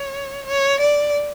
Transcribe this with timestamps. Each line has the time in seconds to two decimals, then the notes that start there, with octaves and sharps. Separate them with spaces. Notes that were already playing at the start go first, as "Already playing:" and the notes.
Already playing: C#5
0.46 C#5
0.80 D5